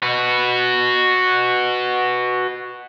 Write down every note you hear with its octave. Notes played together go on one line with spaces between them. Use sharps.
F#4 B4